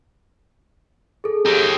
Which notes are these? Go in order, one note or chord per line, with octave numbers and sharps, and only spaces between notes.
G#4 A4
G4 A#4